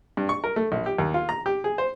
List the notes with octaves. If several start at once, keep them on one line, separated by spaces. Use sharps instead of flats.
G2
C#6
A#4
A3
A#1
G4
D#2
F4
A#5
G4
G#4
C5